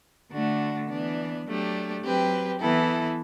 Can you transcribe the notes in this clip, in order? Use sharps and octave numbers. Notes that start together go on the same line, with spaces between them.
D3 A3 D4 F#4
E3 B3 D4
F#3 A3 D4 G4
F#3 C4 G4 B4
E3 B3 E4 A4